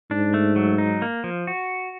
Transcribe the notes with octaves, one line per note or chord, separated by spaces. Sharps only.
G#2 D4
A3
F#3
D#4
A#3
F3
F#4